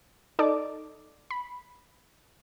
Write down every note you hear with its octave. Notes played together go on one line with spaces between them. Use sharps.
D#4 A4 D5 D#5 D6
B5